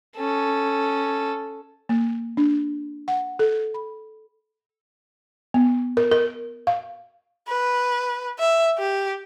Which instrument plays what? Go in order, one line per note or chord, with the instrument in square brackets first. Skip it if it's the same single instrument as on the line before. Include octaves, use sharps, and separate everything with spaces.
[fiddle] C#4 A4
[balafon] A#3
D4
F#5
A4
B5
B3
A#4
A#4
F5
[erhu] B4
E5
G4